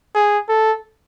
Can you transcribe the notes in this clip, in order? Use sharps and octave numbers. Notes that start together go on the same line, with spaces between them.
G#4
A4